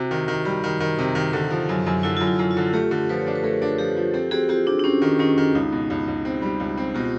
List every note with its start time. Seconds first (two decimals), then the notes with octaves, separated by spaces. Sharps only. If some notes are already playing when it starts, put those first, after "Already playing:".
Already playing: C3 E4 F#4
0.11 D#3
0.28 D#3
0.45 G3
0.64 D#3
0.80 D#3
0.98 C3
1.15 D#3
1.33 D3
1.50 F3
1.69 F#2
1.86 F#2
2.03 D3 E4
2.17 F#2 F4
2.27 E4
2.39 F#2
2.51 F4
2.57 D3
2.73 A3 F4 G4
2.91 D3
3.09 F3 A4 B4
3.19 C#5
3.27 D4 C5
3.35 B4
3.43 A3 G#4 A#4
3.62 D4
3.78 F3 G4 A4
3.97 F3
4.14 C4 G4 A4
4.31 C4 F#4 G#4
4.44 G#4
4.49 C4 F4 G4
4.67 C4 D4
4.79 D4
4.84 C4 C#4
5.02 D#3
5.19 D#3 C#4
5.38 D#3
5.55 C#2 D#4
5.72 B2
5.90 C#2
6.08 C#2
6.25 C4
6.42 G3
6.60 C#2
6.77 C4
6.95 B2 F4 G4